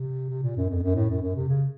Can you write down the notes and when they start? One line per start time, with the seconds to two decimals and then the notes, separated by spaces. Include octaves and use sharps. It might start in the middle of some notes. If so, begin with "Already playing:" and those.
Already playing: C3
0.29 C3
0.42 A#2
0.56 F#2
0.70 F2
0.83 F#2
0.95 A2
1.10 F#2
1.22 F#2
1.36 C3
1.49 C#3